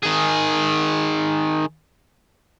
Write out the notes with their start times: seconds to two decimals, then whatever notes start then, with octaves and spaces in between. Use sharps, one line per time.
0.03 D#3 G#4